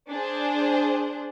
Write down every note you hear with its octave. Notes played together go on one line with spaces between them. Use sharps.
D4 G#4 C5